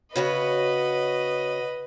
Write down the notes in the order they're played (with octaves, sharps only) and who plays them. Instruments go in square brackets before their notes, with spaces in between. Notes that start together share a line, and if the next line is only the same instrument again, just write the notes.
[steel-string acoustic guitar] C#3 F#4 C#5 [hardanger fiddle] B4 D#5